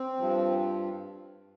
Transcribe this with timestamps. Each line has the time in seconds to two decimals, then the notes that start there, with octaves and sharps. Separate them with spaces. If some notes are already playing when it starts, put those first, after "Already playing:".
Already playing: C4
0.17 G2 F3